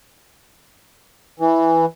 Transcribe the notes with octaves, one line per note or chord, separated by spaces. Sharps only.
E3